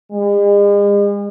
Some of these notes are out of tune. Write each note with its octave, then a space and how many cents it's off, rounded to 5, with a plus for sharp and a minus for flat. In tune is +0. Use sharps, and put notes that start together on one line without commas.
G#3 -45